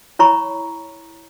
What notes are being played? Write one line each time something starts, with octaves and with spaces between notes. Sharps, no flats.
E4 C#5 A#5 B5 C#6